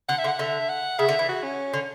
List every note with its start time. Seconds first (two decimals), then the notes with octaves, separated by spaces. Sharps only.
0.09 D3 F#5
0.19 E5
0.24 D3
0.28 F#5
0.39 D3 E5
0.69 F#5
0.99 C#3 E5
1.09 D3
1.19 E3
1.29 F#4
1.44 C#4
1.73 D3